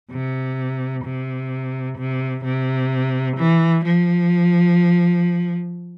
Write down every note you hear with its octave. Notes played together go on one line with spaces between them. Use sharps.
C3
C3
C3
C3
E3
F3